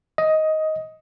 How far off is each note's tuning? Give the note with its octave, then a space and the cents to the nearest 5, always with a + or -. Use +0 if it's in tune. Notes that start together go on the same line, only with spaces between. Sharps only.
D#5 +10